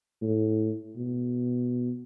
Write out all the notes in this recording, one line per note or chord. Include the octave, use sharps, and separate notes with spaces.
A2
B2